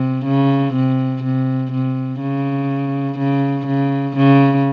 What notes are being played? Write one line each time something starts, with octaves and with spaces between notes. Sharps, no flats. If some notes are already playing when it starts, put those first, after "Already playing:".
Already playing: C3
C#3
C3
C3
C3
C#3
C#3
C#3
C#3